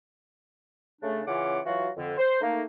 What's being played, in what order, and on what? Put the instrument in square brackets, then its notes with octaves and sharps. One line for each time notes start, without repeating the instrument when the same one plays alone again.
[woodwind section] C#3 A3 D4
C#3 E3 C#4 F4 F#5 D6
E3 F#3 F4 F#4
F2 D3
C5
A3 A#3 D#4